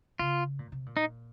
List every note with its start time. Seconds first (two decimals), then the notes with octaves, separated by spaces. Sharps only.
0.19 C#3 F4
0.59 A#2
0.72 C3
0.86 A#2
0.97 D#4